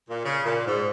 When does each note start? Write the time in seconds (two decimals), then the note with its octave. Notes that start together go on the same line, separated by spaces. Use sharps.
0.09 A#2
0.25 C#3
0.45 A#2
0.67 G#2